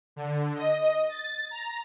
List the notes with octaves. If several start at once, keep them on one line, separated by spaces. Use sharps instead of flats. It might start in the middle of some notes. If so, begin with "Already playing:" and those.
D3
D#5
A6
A#5